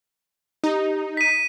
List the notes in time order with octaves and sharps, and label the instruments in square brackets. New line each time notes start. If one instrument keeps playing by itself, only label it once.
[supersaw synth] D#4 [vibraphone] G4
[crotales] B6 D#7